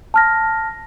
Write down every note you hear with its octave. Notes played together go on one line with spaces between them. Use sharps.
A5 F6 A#6